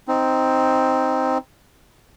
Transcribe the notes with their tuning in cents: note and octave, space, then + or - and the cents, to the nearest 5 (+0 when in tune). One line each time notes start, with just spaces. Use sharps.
C4 +0 D#4 +10